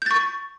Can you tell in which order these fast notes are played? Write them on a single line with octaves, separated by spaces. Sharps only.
G6 A6 C#6